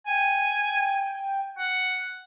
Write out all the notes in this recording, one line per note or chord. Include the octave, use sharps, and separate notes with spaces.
G5 G#5
F#5